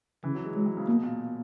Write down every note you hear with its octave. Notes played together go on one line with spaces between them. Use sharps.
C#3 E3
F#3
G#3
F#3 G#3
E3
C#3
B2 A#3
A#2